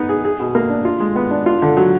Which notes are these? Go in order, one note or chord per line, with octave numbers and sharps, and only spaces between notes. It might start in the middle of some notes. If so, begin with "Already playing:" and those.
Already playing: B3 D#4
G#4
G#4
B2
A#3
D4
F4
G#3
B3
D4
F4
D3
F#3